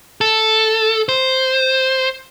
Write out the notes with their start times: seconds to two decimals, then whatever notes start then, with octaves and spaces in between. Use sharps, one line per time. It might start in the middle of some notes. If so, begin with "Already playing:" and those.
0.21 A4
1.09 C5